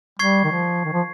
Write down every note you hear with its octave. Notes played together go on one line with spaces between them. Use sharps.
G3 C#6 G#6 C7
D#3
F3
D#3
F3